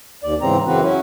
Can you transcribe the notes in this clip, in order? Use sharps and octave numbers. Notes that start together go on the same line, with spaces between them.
D#2 D5
G#2 C#3 E3 C4 A#5
F#2 C#3 E3 C4 F#4 B4
F#3 C#4 E4 F#4